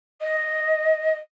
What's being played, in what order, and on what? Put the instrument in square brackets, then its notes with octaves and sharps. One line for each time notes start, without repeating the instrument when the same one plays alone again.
[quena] D#5